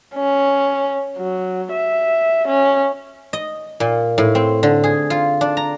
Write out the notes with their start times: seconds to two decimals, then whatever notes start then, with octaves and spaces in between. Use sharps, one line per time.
0.15 C#4
1.17 F#3
1.72 E5
2.48 C#4
3.33 D#5
3.80 A#2
4.18 A2
4.35 C4
4.63 D3
4.84 G#4
5.10 F4
5.41 D4
5.57 A#5